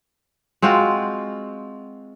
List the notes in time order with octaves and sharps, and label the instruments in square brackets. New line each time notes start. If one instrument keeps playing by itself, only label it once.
[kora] G#3 C4 F4 F#4